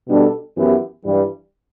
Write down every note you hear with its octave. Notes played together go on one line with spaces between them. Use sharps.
B2 G3 D4 A4
F#2 E3 B3 E4 G4
G2 E3 G3